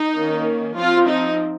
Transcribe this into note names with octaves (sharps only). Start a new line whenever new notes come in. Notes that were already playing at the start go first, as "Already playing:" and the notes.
Already playing: D#4
D#3 A#3 C#4
F3 C4 F4
D#4